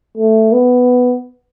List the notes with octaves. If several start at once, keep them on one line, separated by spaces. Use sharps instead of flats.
A3
B3